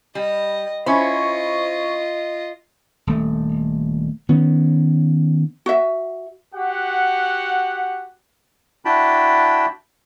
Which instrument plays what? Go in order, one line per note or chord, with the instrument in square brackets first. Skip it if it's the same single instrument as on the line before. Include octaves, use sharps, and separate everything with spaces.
[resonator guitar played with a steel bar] G3 [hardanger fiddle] D#5
[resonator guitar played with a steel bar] C#4 E4 [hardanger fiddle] F4 D#5 [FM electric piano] C5 C#6
[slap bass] D#1 A3
D#3 B3 C#4
[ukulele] F#4 E5
[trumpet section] F#4 G4 F#5
[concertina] D4 E4 F#4 G5 A5 B5